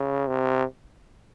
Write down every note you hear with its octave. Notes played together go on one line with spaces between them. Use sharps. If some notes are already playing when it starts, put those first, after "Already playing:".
Already playing: C#3
C3